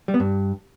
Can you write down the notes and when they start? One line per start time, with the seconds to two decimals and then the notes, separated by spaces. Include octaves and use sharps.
0.08 G3
0.14 B3
0.20 G2